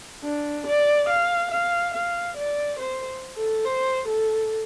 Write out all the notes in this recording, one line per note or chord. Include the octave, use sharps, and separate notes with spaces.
D4
D5
F5
F5
F5
D5
C5
A4
C5
A4